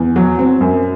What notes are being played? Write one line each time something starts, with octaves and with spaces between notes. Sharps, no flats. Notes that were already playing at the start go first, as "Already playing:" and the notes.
Already playing: E2
F#3
C4
F#2